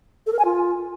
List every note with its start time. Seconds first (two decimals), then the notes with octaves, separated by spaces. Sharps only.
0.26 A4
0.33 A#4
0.39 G#5
0.45 F4